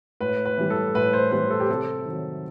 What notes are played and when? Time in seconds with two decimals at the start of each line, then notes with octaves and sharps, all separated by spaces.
0.20 A2 B4
0.45 B4
0.58 E3 G3
0.70 A4
0.94 A2 B4
1.13 C5
1.32 E3 G3 B4
1.50 A4
1.60 G4
1.68 C3 A4
2.06 D#3 F#3